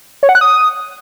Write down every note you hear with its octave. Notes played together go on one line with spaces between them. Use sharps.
C#5
F#5
F#6
D#6